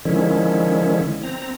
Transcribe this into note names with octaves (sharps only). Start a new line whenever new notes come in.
D3 D#3 F3 G#3 C#4 E4
C4 A#5